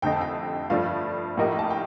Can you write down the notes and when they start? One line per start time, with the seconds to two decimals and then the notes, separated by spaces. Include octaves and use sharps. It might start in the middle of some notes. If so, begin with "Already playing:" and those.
0.02 F2 D3 A3 D#4 G5
0.12 A5
0.21 G5
0.70 G2 F3 A3 D4 F5
1.37 A2 F3 A#3 D#4 G4
1.59 A5
1.70 G5